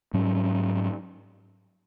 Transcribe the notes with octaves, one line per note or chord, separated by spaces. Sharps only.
G#2 F#3 C#4